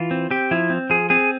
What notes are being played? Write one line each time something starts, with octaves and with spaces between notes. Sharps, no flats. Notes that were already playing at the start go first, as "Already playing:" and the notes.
Already playing: E3 F4
C4
C4 G4
F3 E4
C4
F3 G#4
C4 G#4